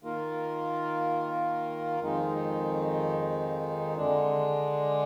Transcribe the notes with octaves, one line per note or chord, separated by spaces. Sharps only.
D#3 A#3 F4 A#4
F2 D#3 G#3 D#4
D3 G#3 D4